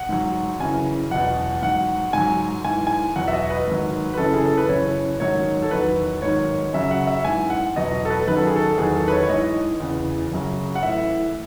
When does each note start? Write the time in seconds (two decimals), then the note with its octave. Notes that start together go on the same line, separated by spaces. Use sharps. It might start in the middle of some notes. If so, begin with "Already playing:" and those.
Already playing: F#5
0.09 G#2 F#3
0.60 F#2 C#3 E3 G#5
1.11 E2 B2 F#3 F#5
1.62 G#2 F#3 F#5
2.13 G#2 F#3 G#5
2.65 G#2 E3 G#5
2.87 G#5
3.16 E2 B2 F#3 F#5
3.28 E5
3.33 D#5
3.50 B4
3.68 G#2 D#3 F#3
4.13 B4
4.17 F#2 C#3 E3 A4
4.34 G#4
4.46 A4
4.57 B4
4.69 F#2 C#3 E3 C#5
5.20 G#2 D#3 F#3 C#5
5.62 A4
5.71 E2 D#3 F#3 B4
6.22 G#2 D#3 F#3 C#5
6.73 F#2 C#3 F#3 E5
6.91 F#5
7.07 E5
7.25 G#2 E3 G#5
7.50 F#5
7.76 E2 B2 F#3 D#5
8.05 A4
8.10 B4
8.27 F#2 D#3 F#3 B4
8.37 A4
8.47 G#4
8.56 A4
8.78 E2 D#3 F#3 G#4
8.96 A4
9.08 B4
9.12 C#5
9.23 C#5
9.30 G#2 E3 D#5
9.80 E2 C#3 E3
10.31 F#2 C#3 F#3
10.75 F#5
10.83 A2 E3 E5